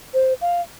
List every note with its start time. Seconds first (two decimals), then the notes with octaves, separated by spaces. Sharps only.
0.14 C5
0.41 F5